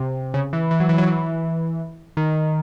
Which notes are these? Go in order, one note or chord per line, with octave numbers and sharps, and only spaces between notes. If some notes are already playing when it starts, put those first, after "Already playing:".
Already playing: C3
C#3
E3
E3
F#3
E3
F#3
E3
D#3